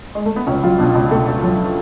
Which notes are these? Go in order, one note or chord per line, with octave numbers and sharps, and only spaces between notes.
G#3
A3
B3
C#2 C#4
F#3 F4
B2 D4
C#2
B2 A3
C#2
F#3